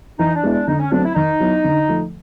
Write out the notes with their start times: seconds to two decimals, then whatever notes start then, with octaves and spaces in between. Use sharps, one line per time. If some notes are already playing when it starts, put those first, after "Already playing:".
0.19 E3 D#4
0.35 D4
0.43 G#3 B3 E4
0.51 D4
0.67 D3 D#4
0.79 C#4
0.92 F#3 A3 C4 D4
1.04 E4
1.15 D#3 D#4
1.40 F#3 B3 E4
1.64 D3
1.88 F3 A3